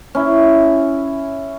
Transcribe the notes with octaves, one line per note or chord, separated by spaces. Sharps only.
C#4 E4